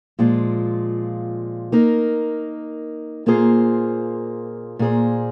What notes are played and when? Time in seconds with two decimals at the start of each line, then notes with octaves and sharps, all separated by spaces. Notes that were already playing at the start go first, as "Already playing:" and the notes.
0.19 A#2 F3 G#3 F4
1.72 A#3 D#4 A#4
3.26 A#2 A#3 F4 G#4 C5
4.79 A#2 A#3 G#4 C5